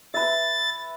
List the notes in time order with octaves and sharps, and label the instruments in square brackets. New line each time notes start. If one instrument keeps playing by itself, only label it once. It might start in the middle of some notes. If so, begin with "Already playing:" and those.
[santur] B4 E5 [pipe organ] A6